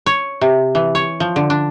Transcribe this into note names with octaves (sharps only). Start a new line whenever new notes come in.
C#5
C3
E3
C#5
F3
D3
D4